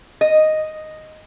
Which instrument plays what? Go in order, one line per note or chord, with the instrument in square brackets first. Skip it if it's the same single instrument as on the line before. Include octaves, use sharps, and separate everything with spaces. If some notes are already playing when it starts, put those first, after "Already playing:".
[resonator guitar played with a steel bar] D#5